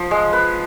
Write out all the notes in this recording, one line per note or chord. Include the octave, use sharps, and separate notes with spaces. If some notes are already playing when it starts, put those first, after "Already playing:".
Already playing: F3
G#3
B4